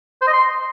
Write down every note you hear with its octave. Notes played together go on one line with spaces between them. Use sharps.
C5
D#5
C6